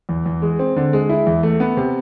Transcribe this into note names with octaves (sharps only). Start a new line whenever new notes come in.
E2
E2
G#3
C4
D3
G#3
E4
E2
A3
B3
C3